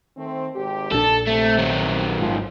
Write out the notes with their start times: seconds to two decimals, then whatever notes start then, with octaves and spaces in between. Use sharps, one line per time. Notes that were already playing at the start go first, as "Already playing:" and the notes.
0.17 D#3 A3 C4
0.55 G#1 C3 G4
0.92 A#1 A#2 D4 A4 A5
1.27 C3 A3
1.58 D#3 F#3
2.19 G#1 G#2 F3